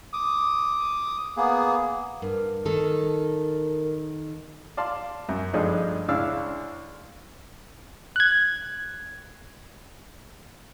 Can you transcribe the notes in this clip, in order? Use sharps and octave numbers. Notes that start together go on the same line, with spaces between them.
D6 D#6
A#3 B3 G#4
G2 A#4
D#3 A4
D5 F5 A5 C6
F#2
G2 F3 G#3 A3 D4 D#4
C#2 C#3 D4 E4 F5 E6
F#6 G#6